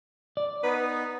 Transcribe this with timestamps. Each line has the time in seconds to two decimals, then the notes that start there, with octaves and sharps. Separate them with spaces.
0.37 D5
0.63 B3 D#4 B4